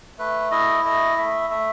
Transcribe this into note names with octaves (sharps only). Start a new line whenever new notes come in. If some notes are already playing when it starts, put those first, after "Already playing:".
A3 B4
E4 D#5
A3 D#5
A3 E5
A3 E5